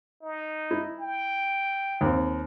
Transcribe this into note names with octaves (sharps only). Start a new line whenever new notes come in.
D#4
E4
G5
D#2 C4